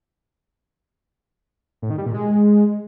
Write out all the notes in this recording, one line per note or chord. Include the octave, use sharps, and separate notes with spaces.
A2
D#3
G3
A#2
G#3